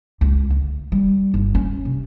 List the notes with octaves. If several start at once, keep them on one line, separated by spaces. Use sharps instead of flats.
C#2
D2
G3
G1
C#4
C3